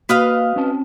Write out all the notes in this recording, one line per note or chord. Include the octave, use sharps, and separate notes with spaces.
A#3 F#4 B4 D#5 F5 D#6 F6
C4 C#4 A5